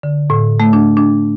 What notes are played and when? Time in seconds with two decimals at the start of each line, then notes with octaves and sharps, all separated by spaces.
0.03 D3
0.30 A2
0.60 A3
0.73 D4
0.97 D4